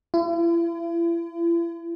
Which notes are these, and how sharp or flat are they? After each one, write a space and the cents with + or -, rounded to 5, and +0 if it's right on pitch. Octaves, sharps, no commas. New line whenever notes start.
E4 +45